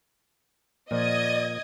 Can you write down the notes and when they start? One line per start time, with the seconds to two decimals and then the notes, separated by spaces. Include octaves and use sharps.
0.91 A#2 F3 D5 D#5 D#6 G#6